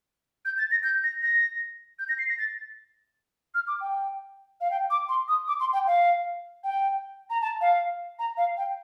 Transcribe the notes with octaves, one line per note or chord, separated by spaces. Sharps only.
G6
A6
A#6
G6
A#6
A#6
G6
A#6
C7
A#6
A6
F6
D6
G5
F5
G5
D6
C6
D#6
D6
C6
G5
F5
G5
A#5
A5
F5
A#5
F5
G5